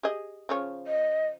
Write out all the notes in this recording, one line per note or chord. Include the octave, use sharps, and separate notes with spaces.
G4 G#4 D#5
C#3 F3 C#5
D#5